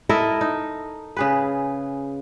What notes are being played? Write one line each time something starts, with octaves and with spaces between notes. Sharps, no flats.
E4 A4 A#4 D#5
D#4
C#3 G#4 B4